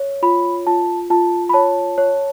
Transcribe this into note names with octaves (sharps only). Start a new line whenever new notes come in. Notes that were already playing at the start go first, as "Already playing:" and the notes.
Already playing: C#5
F4 B5
F4 A5
F4 A5
B5
C#5 A5
C#5